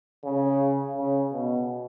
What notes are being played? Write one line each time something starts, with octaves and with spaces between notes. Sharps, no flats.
C#3
C#3
B2